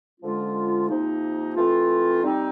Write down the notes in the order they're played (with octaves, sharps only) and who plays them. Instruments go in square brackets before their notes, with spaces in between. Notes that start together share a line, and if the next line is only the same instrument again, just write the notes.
[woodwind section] D3 F3 G#3 C#4 F4
C3 F3 A#3 D#4
E3 A3 C4 F4
G3 C4 D#4